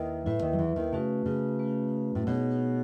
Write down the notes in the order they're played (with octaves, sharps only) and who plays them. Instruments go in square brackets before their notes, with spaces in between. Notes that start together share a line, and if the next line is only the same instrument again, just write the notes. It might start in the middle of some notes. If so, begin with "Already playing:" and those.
Already playing: [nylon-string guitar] D#2 D#3 [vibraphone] E4 B4 E5
[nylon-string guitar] A2 [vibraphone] E4 B4 E5
[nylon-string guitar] D#2 D#3
F#3
E2 E3
D#2 D#3
[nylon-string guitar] C#3 [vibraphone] A3 C#4 F#4 B4
[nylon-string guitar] C#3
[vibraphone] A3 C#4 F#4 B4
[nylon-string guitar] A2
[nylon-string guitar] B2 [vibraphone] D#4 G#4 C#5